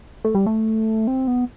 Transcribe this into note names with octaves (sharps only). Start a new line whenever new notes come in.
A3
G3
A3
C4
B3